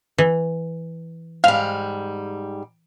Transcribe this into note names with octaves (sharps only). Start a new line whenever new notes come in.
E3
G#2 G3 F5 F6